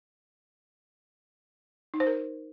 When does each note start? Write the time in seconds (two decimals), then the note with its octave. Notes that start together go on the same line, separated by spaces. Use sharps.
1.94 D#4
2.00 C5
2.07 A#4